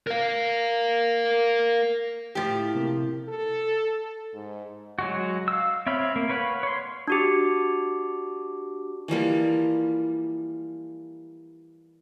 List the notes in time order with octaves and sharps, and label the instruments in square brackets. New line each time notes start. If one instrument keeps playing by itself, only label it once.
[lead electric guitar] A#4 F5
[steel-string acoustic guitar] A2 [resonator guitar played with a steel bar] F3 G4
[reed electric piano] C3 A#3
[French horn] A4
G#2
[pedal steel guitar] F#3 G#3 F#4
F5 E6
C4 C#5 E5 F5 B5
A#3
B4 C#5 F5 F#5 B5
C#5 C6
[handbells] D4 F#4 G4
[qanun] E3 F3 G3 A#3